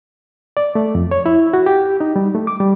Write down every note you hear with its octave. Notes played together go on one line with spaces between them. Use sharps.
D5
A3
F2
C#5
E4
F#4
G4
D#4
G3
A3
D6
G3